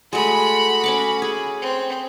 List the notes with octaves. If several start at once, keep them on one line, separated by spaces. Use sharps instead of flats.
G#3 A3 F#4 B5
C#4 C#6 D6
G#4
C4